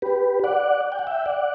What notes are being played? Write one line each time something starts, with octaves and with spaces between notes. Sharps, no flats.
G4 B4
D5 F#5
G5
F#5
E5 G5
D5 F#5